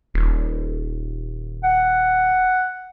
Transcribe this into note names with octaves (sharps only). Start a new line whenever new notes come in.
D#1
F#5